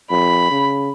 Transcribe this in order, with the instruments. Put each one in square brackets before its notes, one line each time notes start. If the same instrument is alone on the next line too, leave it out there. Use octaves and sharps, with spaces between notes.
[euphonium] F2 [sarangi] B5
[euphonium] C#3